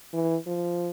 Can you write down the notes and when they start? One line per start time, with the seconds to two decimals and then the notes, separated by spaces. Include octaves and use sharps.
0.13 E3
0.46 F3